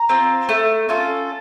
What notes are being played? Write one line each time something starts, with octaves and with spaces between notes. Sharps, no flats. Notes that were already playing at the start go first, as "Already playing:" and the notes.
Already playing: A#5
C4 F4
A3
C#4 F4 A4